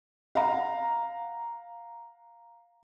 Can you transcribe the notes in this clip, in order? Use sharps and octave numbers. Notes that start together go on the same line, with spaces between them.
F5 F#5 A#5